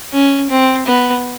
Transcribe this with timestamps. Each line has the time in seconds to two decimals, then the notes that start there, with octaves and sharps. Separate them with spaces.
0.13 C#4
0.50 C4
0.86 B3